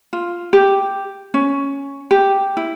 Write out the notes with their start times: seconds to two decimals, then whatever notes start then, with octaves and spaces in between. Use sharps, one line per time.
0.13 F4
0.53 G4
1.34 C#4
2.11 G4
2.57 E4